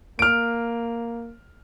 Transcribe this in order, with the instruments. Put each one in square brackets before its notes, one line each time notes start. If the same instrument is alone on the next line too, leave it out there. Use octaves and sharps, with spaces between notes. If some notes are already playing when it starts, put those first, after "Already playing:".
[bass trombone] A#3 [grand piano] F6 D7